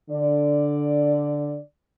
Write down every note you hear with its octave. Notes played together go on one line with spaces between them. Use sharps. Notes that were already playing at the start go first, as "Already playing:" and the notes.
D3 D5